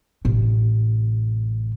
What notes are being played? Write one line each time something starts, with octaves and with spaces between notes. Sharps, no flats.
A1 C3